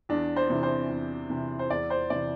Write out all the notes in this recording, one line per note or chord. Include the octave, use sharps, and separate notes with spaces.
E2 D4
C5
C3 E3
C5
E2
C3 E3
C5
E2 D5
C5
C3 E3 D5